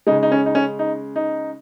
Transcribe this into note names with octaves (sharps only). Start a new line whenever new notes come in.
C#3 G#3 D#4
D#4
C#4
D#4
C#4
D#4
D#4